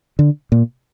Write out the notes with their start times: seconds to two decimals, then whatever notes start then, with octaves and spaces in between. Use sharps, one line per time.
0.19 D3
0.52 A#2